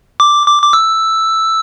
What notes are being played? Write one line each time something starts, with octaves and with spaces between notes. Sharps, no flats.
D6
D6
D6
E6